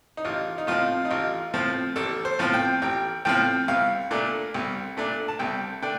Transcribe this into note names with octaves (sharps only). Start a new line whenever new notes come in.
D#4
A1 F4
D#4
A2 F3 C4 F4
D#4
A1 F4
A2 F3 C4
A1 A4
C5
A2 F3 C4
G5
A1 G5
A2 F3 C4 G5
C2 F5
A#2 A3 D4
C2
A#2 A3 D4
A5
C2 G5
A3 D4 G5